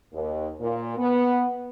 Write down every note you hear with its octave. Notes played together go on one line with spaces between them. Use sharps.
D#2
A#2
B3